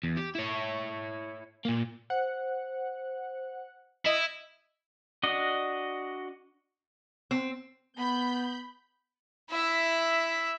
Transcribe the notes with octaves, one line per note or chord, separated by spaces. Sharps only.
E2
G4
E4 C#5
A#2 A#3
C5 F#5
E4 D#5
D4 F#4 D#5
C4
B3 B5 G6
E4 E5